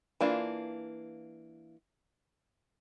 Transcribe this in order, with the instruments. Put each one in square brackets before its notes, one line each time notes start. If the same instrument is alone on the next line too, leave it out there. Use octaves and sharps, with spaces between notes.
[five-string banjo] E3 A#3 D4 F4